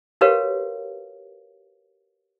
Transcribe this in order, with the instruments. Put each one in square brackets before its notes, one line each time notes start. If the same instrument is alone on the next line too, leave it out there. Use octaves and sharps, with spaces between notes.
[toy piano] F#4 G4 A#4 B4 C#5 F5